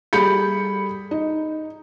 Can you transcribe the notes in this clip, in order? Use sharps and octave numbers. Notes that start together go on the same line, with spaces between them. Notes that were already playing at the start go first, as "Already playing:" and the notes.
G3 G#4 A4 B5 G6 C#7
D#4